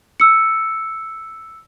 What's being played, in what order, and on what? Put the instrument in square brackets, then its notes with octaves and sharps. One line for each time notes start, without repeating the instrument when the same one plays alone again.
[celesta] E6 C#7